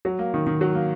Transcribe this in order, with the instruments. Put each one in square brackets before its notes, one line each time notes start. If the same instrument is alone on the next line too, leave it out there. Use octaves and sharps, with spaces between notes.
[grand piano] F#3
A#3
D#3
D#3
F#3
A#3